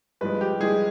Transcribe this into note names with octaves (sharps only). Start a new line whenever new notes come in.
G2 F3 G#3 B4
G4
G2 F3 G#3 G#4